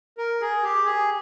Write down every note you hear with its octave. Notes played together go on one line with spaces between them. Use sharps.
A#4
G#4
G4
G#4